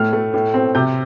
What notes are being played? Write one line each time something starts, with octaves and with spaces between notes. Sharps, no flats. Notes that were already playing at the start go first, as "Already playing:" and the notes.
Already playing: A2 A3 F6
A3
A2
C4
C3 G6